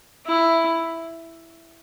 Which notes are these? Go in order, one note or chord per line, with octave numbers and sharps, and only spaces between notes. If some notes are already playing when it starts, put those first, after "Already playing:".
E4